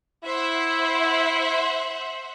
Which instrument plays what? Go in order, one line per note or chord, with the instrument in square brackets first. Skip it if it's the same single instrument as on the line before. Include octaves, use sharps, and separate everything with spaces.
[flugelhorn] E4 [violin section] C5 E5 F#5